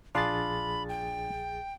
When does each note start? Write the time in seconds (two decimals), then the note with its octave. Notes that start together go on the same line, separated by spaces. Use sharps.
0.15 A#1 D4 F4 G#4 F5 B5 A6
0.89 G5